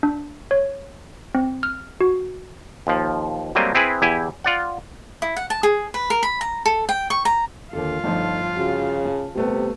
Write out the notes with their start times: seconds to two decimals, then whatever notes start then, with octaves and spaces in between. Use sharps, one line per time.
0.03 D4
0.51 C#5
1.35 C4
1.63 F6
2.01 F#4
2.87 D#2 F3
3.55 F#3 G3 A3 A#3 C4 D#5
3.75 C4 E4 G#4 B4
4.02 E2 E4 G4 G#5
4.44 F4 D5 F#5
5.22 E4
5.37 F#5
5.50 A5
5.63 G#4
5.94 B4
6.10 A#4
6.23 B5
6.41 A#5
6.66 A4
6.89 G5
7.10 C#6
7.25 A#5
7.73 D#2 D3 F4 A4
8.04 G1 F3 A3 D#4
8.57 C#3 F#4
9.05 A5
9.35 C3 G3 A3 B3